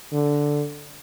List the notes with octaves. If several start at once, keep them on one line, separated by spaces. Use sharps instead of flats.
D3